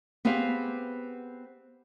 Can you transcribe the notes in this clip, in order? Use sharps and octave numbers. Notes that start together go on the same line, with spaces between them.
B3 C4 G4 G#4 B4 F5